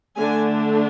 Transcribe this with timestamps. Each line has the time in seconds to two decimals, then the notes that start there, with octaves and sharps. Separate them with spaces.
0.18 D3 A3 D4 G#5